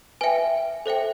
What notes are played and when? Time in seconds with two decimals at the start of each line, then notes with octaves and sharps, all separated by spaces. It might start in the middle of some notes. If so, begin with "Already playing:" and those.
0.21 B4 E5 G5 G#5
0.86 A4 C5 E5 G5